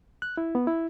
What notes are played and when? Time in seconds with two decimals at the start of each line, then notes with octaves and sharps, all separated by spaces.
0.22 F#6
0.37 E4
0.55 B3
0.67 E4